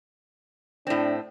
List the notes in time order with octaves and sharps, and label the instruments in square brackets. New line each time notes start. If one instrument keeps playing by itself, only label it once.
[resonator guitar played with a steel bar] A2 C4 [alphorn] D4